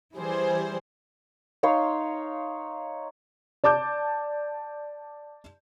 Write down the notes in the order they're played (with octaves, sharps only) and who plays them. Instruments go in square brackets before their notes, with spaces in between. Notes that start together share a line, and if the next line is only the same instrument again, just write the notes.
[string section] E3 G3 G#4 C5
[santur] D#4 C#5 F5 C6
[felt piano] D5 A5 D6 G6